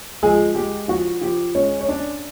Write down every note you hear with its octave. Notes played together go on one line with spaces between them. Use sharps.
F3 G#3 G#4
G#3 G4
F3 F#4
F3 G4
G#3 C#4 C#5
C#5
C#4 D4 D5